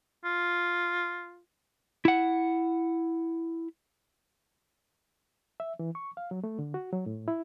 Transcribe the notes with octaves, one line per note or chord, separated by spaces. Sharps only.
F4
E4 F#5
E5
E3
C#6
F5
F#3
A3
D3
F#4
F#3
A2
E4